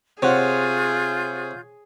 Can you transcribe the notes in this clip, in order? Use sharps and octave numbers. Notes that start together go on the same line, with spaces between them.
C3 F4 G#4 C#5 F#5 G6